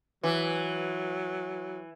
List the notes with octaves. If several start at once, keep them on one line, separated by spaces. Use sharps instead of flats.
E3 F#3